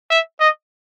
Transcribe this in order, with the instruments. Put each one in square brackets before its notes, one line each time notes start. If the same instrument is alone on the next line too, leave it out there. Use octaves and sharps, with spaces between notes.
[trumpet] E5
D#5